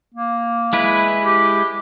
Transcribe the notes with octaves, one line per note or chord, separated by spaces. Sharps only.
A#3
G#3 E4 B4
G4